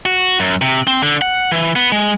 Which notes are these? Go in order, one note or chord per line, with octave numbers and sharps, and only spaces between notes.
F#4
F#2
C3
C4
D3
F#5
E3
B3
G#3